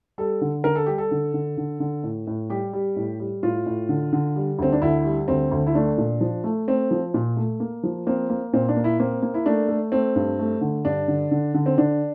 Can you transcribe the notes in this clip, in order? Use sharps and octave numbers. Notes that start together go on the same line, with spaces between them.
G3 A4
D3
D3 A#4
A4
G3 G4
A4
D3
D3
D3
D3
A2
A2
G3 G4
G3
A2
G3
A2 F4
A2
D3
D3
G3
D2 C4
D4
D2 E4
G3
D2 C4
D2
E4
A3 D4
A#2
F3
A3
A3 C4
F3
A#2
A3
A#3
F3
A#3 C4
A#3
A#2 C4
D4
A#3
E4
A#3 C4
A#3
E4
A3 D4
A3
A3 C4
G2
A3
D3
G2 D4
D3
D3
D3
C4
D3 D4